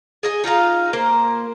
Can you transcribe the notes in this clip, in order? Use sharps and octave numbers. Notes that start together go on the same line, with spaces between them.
G#4 D#5 G#5
D#4 F4 D#5 F5
A#3 C5